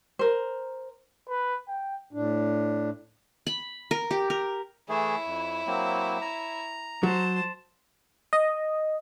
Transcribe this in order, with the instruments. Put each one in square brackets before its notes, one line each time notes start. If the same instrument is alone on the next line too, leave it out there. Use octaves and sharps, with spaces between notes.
[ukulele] A#4 C5
[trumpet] B4
G5
[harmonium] A2 D4
[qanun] B5
A#4
G4
A#4
[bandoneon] E3 A3 G#4 [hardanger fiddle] E4 C#5
[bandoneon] F2
F#3 A#3 C4
A#5
[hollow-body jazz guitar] F#3 [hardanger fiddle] C5 A5
[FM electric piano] D#5